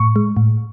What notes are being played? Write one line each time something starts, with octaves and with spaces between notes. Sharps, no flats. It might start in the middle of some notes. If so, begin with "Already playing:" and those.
Already playing: A2 C#6
G#3
A2